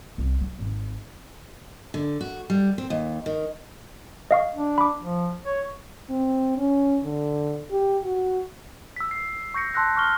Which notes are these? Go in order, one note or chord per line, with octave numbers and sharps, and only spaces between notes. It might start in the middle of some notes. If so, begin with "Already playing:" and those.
C2
F#3
G#1
D3
F#4
G3
C4
D#2
D#3
D#5 F5 C#6
D4
B5 D6
F3
C#5
C4
C#4
D3
G4
F#4
E6 B6
C7
C#6 G6 A#6 C#7
A5 C6 E6 F#6 A#6
C#6 F6 G7